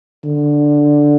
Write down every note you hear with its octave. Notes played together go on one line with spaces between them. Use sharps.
D3